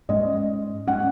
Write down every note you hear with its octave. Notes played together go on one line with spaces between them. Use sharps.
G#2 G#3 C#4 D#5
G#3 C#4 F#5